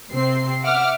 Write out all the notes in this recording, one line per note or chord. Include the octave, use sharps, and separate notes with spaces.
C3 C4 C7
E5 F#5 D6 F6